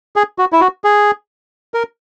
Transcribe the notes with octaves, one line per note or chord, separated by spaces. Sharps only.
G#4
F#4
E4
F#4
G#4
A#4